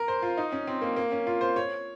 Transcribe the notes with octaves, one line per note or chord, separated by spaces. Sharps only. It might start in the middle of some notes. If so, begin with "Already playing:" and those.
Already playing: A#4
C5
F4
D#4
C#4
C4
A#3
A#3
C#4
F4
C5
C#5